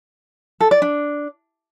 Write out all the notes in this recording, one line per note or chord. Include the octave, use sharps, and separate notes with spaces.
A4
D5
D4